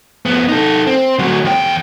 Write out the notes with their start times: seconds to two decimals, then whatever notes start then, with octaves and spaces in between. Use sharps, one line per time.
0.26 F2 B3
0.49 D#4 A4
0.87 C4
1.19 D2 F#3
1.45 E2 G5